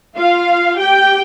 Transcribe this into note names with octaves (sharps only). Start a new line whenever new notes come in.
F4 F5
G4 G5